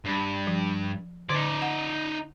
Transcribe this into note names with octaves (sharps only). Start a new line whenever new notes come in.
G2
F3
D3 D#4 D5
F#5